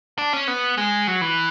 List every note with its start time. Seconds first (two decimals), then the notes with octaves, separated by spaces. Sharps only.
0.18 D4
0.33 C#4
0.47 B3
0.78 G#3
1.08 F#3
1.21 E3